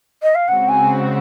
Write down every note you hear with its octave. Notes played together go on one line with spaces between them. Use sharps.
D#5
F5
C#3 G#3 C4 F#4 F#5
G#5